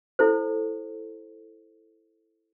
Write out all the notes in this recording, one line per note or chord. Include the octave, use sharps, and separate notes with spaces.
E4 A4 C5